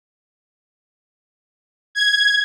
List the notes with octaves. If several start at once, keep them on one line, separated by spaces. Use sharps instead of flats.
G#6